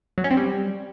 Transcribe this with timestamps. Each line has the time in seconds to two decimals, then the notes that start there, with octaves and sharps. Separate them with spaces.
0.18 F#3
0.24 C#4
0.31 C4
0.37 G3